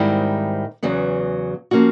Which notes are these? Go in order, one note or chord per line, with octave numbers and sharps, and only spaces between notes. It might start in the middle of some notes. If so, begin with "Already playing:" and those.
Already playing: G#2 D#3 G3 C4 E4
E2 C#3 F#3 B3
F3 A#3 C#4 F#4